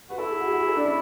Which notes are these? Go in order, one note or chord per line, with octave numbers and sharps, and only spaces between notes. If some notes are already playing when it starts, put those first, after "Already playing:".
F#4 B4
E4 A4
G#4
F#4
G#4
F#4
G#4
A4
D4
C#4 E4